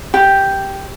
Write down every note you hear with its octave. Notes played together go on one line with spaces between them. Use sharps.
G4